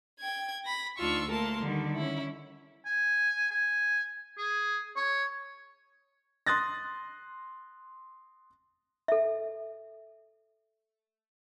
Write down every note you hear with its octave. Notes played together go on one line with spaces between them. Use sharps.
G5 G#6
B5 A#6
D2 D4 D#4 F4 C#6 E6
A3 A#3 A#4 A5 C6
D3 D#3 G3
C#4 E4
G#5
G#5
G#4
C#5
C6 D#6 F#6 A6 A#6
A4 E5